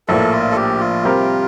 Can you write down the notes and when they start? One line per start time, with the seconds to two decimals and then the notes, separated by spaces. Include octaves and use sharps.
0.08 A#1 A2 F3 A#3 A4
0.32 F4
0.52 A4
0.56 G4
0.80 F4
1.03 C3 G3 C4 G4 A#4